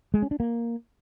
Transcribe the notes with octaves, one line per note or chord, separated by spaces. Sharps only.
G#3
C#4
D4
A#3